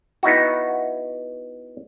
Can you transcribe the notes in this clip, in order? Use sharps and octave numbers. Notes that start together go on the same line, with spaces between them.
B3 D#4 E4 F#4